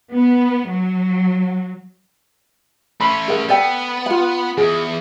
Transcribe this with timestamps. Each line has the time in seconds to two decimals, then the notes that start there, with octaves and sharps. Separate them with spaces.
0.14 B3
0.69 F#3
3.01 A3 C#4 B5 C6
3.28 G#4 A#4 F#5
3.49 B3 A4 D5 G5
4.06 F4 F#5
4.58 E2 G#4